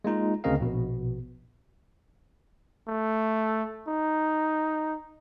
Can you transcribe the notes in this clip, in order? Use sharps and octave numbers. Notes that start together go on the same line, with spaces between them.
G#3 A#3 D#4 F4
D2 C#3 C4 A#4 D#5 F5
A#1 B2
A3
D#4